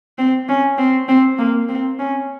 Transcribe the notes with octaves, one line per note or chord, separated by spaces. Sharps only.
C4
C#4
C4
C4
A#3
C4
C#4